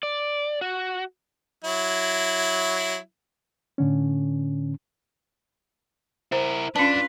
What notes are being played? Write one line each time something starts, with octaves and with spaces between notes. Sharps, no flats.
D5
F#4
F#3 E4
A2 D3 C#4
E4 A#4 C5
C#4 D4 F4 B4 A5